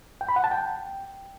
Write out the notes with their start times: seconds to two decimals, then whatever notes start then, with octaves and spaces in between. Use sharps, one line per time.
0.21 G5
0.29 B5
0.36 F#5
0.44 A5
0.51 G5